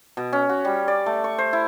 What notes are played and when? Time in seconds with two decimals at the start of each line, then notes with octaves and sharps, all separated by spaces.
0.17 B2
0.33 C#4
0.49 F#4
0.65 G3
0.88 D5
1.06 A3
1.24 C#6
1.38 C5
1.53 E4